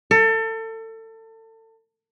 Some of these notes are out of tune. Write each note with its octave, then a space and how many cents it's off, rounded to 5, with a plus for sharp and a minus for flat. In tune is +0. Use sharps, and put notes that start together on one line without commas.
A4 +30